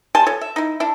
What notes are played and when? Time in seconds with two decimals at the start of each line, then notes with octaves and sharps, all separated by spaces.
0.15 G3 G#5 A5 C6
0.27 F3 A4 C#5
0.41 E5
0.56 D#4 E4
0.80 D4 E4